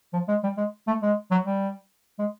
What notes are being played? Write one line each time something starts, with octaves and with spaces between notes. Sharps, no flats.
F3
G#3
G3
G#3
A3
G#3
F#3
G3
G#3